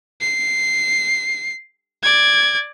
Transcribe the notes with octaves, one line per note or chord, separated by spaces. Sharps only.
C7
D5 G#6